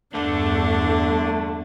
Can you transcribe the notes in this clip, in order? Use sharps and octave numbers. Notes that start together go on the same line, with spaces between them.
E2 G2 D3 A3 D4